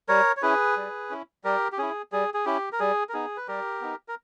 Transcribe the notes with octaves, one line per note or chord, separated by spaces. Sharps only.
G3 A#4 C#5
C#5
C#4 E4 G#4 B4
G3
C#4 E4
G3 G4 A#4
G4
C#4 E4 G#4
G3 G#4
G#4
C#4 E4 G4
A#4
G3 G#4
A#4
B3 D#4 G#4
B4
G3 G4 A#4
B3 D#4
A#4